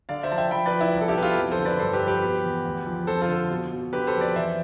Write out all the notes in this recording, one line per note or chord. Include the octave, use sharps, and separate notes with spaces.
D3 D5 F5
C5 E5
F3 A5
E5 G5
F3 G5 B5
B4 D5
F3
E4
C2
A4
E4 G4
B2 B4
F4 A4
F2
A4 C5
D3
B4 D5
G2 A4 C5
G4 B4
F3
G4 B4
B2
E2
D2
F3
F2 A4 C5
F4 A4
D3
B2
B2
D3 G4 B4
A4 C5
F2
B4 D5
E3 C5 E5